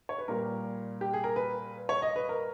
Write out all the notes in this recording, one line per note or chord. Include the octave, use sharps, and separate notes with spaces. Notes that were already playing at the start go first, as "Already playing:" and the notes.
C#5
B4
A#2 G3 A#4
G4
G#4
A#4
B4
C#5
D#5
B4
A#4